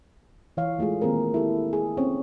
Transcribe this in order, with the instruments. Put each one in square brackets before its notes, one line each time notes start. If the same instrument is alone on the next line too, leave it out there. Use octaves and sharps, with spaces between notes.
[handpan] E3 C#5 F5
G#3 A3 F4 G#4
D#3 A#3 C4 G#4 A#4
E4 G4 A4
G#4
C4 C#4 C#5